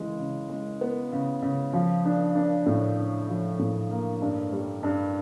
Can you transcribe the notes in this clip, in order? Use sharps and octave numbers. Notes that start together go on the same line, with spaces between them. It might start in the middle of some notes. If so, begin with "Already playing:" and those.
Already playing: C#3 E3 G#3
C#3
G#3
B3
C#3
C#3
F3
D4
D4
A2
D4
F3
A2
A#3
G2
G3
G2